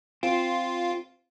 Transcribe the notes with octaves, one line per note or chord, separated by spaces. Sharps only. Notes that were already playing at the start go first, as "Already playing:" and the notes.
C4 F4